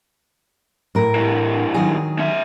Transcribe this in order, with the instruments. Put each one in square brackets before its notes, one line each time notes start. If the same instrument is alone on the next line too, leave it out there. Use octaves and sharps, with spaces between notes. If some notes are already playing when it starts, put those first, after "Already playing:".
[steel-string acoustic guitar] A2 A#4
[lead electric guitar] G2 E3
[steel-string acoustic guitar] D#3 F#3 G#4
[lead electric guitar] C#4 E5